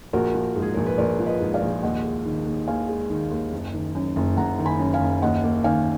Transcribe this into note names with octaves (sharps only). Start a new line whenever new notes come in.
A#1 F#4 A#4
F3
G#2
G#4
A#1 A#4
B4
A#1 A#4 D5
F3
B4 D#5
G#2
D5 F5
A#1
D#2 D#5 F#5
G#3
D#3
D#2
D#2 F5 G#5
G#3
D#3
D#2
F#1
D#3
F#2
F#1
F#1 F#5 A#5
D#3
G#5 B5
F#2
F5 G#5
F#1
D#2 D#5 F#5
A#3
D#3 F5 G#5